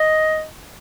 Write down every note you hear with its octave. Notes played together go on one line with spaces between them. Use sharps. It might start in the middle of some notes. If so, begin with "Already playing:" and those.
Already playing: D#5